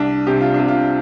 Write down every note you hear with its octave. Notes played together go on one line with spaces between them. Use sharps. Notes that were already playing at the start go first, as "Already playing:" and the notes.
Already playing: C2 D4
C3 G4
F4
D4
C3
F4